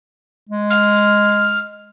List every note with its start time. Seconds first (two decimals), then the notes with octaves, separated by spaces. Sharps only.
0.49 G#3
0.70 F6